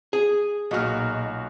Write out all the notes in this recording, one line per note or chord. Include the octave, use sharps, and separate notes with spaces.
G#4
B1 A#2 D#4 F#4 F6